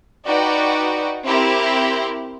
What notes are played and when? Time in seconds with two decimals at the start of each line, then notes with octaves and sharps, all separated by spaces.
0.25 D#4 F#4 B4 D5 G5
1.25 C4 E4 G4 A#4